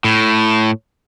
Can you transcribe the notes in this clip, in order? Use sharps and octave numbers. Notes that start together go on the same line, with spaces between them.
A2